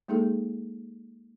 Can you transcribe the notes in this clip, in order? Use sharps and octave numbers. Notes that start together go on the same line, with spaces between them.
G#3 A#3 D#4 G#4 A4